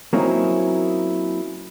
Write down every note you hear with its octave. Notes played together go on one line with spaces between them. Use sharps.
F#3 A#3 C4 C#4 D#4 E4